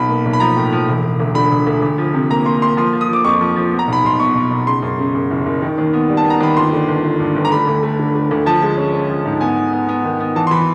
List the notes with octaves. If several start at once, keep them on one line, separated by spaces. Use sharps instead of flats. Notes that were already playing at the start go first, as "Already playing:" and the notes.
Already playing: B1 B3 B5
A#3
B1
B5
F3 A#5
A2
F3
E1
E1
D2
D3 B5
E1
D2
D2
F3
C3
A#3 A#5
A#3 C6
A#3 C6
F3 C6
F3
D#6
F3 D6
F2 C#6
F3
F3
B3
A#5
B1
B5
B1 C6
B2 C#6
B2
B2
C#3 C6
F#2
C#3
F#2
F#1
F#1
D#3
D#2
B3
G3
A5
B3
A#5
D#2 B5
G1 C6
D3
G1
G1
G2
G1
A#5
A3 B5
D2
A3
D3
A3
D2
F3 A5
G#3
C#4
C#4
F3
G#2
B3 G#5
B3
B3
B3
D#3
B3
E3 A5
C6
E3 B5